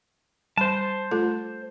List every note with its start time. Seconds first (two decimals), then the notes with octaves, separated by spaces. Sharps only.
0.58 G3 C5 A5 B5
1.11 A3 F4 A4